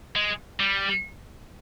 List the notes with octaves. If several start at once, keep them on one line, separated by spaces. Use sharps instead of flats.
G#3
G3